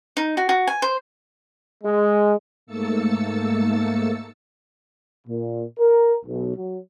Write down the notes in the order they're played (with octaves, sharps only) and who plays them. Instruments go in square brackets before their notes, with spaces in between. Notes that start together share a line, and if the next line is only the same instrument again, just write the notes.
[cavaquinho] D#4
F#4
F#4
G#5
C5
[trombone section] G#3
[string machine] G#2 A3 A#3 E6 A6 C#7
[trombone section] A#2
A#4
B1
F#3